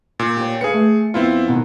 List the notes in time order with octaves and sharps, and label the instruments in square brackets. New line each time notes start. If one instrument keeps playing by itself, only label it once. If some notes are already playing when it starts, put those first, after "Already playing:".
[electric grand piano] A#2
[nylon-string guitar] G4 C#5
[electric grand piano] G#4 C#7 [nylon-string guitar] B4 F5
[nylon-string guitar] A3
[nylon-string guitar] F2 B3 [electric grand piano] C4 E4 F4
[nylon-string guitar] B2 D#3